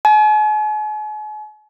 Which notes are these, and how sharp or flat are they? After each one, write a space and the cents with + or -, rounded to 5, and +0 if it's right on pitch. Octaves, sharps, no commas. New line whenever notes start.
G#5 +45